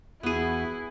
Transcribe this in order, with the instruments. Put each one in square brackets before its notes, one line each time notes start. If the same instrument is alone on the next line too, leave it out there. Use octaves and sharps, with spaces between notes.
[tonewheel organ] E2 F#4 [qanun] B3 G#4 [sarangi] E4